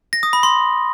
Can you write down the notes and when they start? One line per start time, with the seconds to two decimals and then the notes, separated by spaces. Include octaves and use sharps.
0.13 A#6
0.23 D#6
0.33 B5
0.43 C6